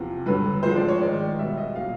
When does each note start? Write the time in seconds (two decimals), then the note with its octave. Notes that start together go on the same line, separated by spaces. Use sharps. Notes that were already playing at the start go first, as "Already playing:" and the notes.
Already playing: E2 C3 F3
0.26 G2 D3 F#3 B4
0.63 A2 F3 G#3 C5
0.75 D5
0.88 C#5
1.00 G#2 D#3 G#3 D5
1.39 B2 G3 E5
1.57 D#5
1.75 A#2 F#3 F5